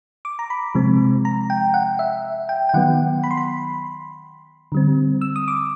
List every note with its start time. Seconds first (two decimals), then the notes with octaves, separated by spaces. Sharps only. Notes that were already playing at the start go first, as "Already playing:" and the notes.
0.25 D6
0.39 A#5
0.50 B5
0.75 C3 F3 G#3 C4
1.25 A#5
1.50 G5
1.74 F#5
1.99 E5
2.49 G5
2.69 G5
2.74 D#3 F#3 B3 F#5
3.24 B5
3.31 C6
3.37 B5
4.72 D3 G3 C4
5.21 E6
5.36 D#6
5.48 D6